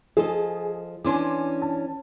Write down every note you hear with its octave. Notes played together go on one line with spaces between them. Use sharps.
F3 G#4 A4 D#5
E3 C#4 D4 G#5 C6 D6
A5